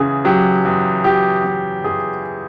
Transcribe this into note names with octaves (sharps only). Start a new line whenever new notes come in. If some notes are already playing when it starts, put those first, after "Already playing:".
Already playing: E2 C#3 G#4
F#3 G4
E2
F#3 G4
E2
E2 G#4